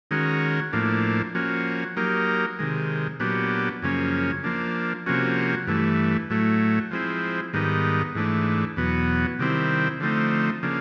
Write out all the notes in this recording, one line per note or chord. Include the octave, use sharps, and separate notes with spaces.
D#3 G#3 C#4 F#4 A#4
A2 F3 A#3 D4
F3 A#3 C#4 F#4
F#3 A#3 D#4 G4 A#4
C3 D#3 G#3
A#2 F#3 B3 D4 G4
F#2 C#3 F3 A#3 C#4
F3 A#3 D4
C3 F3 A#3 C#4 F#4
G2 E3 A3
A2 F#3 A3
F3 G#3 C4 E4
G#2 D#3 G3 B3 D#4
G#2 E3 A3 D4
E2 B2 F#3 B3
C3 D#3 G3 C4 E4
D3 F3 A3 C4 D#4
C#3 F3 A#3 D4